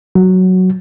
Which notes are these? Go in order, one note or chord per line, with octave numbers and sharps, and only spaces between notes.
F#3